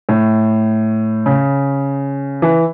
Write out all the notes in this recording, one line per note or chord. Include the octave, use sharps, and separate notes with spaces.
A2
C#3
E3